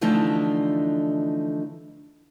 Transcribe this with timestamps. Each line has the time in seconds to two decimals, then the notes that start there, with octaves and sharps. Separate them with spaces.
0.01 D3 E3 F3 A3 D4 D#4